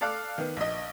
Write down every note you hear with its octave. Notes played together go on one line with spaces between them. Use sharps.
A4 D5 F5 D6 F#6
D#3 B3
A#1 D#5